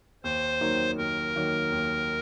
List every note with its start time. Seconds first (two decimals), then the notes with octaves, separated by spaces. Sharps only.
0.24 D#2 C5
0.61 D#3 F#3 A#3 D#4
0.97 D#2 A#4
1.35 D#3 F#3 A#3 D#4
1.72 D#2